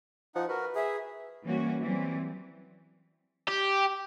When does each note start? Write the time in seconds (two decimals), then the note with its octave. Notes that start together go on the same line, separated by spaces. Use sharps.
0.35 F3 D#4 F#5
0.49 F#4 A#4 B4
0.75 G#4 E5
1.43 E3 G3 A#3 C#4 F#4
1.80 E3 F#3 G3 C4
3.48 G4